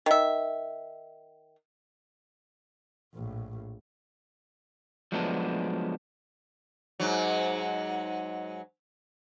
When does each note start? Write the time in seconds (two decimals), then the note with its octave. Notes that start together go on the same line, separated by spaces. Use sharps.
0.06 D#3 E5
3.14 A#1 A2
5.12 F3 F#3 G#3 A3 B3 D4
7.00 G#2 F#3